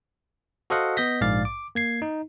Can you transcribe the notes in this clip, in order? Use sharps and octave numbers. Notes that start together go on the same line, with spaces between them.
F#4 A4 C5 D#5 F5 F#5
B3 D#5 G6 A#6 B6
A#1 G#2 D5 F5 A6
D6
A#3 G#6 C7
D#4